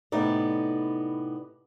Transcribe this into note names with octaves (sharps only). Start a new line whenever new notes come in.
A2 C3 B3 D#4 D5